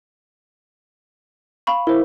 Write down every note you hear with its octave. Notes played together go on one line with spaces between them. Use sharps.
F5 B5 C#6
E4 A#4 C5